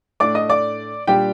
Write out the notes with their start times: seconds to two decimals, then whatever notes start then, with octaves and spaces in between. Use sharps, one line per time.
0.20 A2 A3 D4 D5 D6
0.35 D#5 D#6
0.50 D5 D6
1.07 A#2 G3 D4 G4 G5